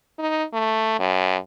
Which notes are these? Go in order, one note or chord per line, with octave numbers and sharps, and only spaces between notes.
D#4
A3
F#2